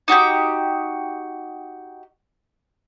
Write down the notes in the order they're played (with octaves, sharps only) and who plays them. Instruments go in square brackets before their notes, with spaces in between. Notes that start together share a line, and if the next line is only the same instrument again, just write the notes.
[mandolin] D#4 F#4 G4 G5